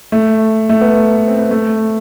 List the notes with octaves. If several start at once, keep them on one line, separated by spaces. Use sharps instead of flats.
A3
A3
B3
C4
B3
A3